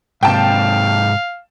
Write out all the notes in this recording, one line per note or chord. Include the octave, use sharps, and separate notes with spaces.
G#2 C3 F5 G5 A5